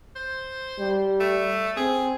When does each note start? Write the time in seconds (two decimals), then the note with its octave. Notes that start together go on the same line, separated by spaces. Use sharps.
0.16 C5
0.79 G3
1.20 A3
1.77 C4 G#4